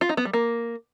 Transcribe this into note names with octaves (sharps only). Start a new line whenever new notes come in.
F4
D#4
B3
G3
A#3